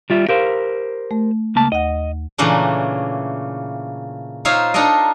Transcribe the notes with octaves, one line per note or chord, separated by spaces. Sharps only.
G3 F4 E5
G4 A#4 C5 F5
A3
C#2 A#3 A5
D#2 D#5 F#5
A#2 C#3 E3 A3 A#3 D4
D#4 F4 C5 C#5 E5 F5
D4 D#4 A4 A#4 D#5